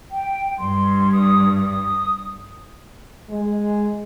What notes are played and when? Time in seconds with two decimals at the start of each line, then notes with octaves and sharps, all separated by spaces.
0.11 G5
0.59 G2 C6
1.13 D#6
1.66 D#6
3.30 G#3